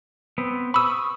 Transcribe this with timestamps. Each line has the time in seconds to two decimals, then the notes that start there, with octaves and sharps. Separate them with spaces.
0.38 B3 C4
0.74 B5 C#6 D#6 E6